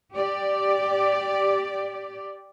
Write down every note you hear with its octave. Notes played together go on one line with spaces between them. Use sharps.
G4 D5